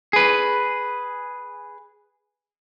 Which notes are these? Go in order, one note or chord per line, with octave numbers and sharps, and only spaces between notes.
G#4 B4